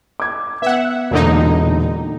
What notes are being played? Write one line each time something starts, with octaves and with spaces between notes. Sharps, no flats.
D6 G#6
B3 E5 F#5
E1 A#2 D3 D#4